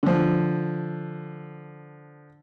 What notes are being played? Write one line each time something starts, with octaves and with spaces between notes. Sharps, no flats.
D3 F3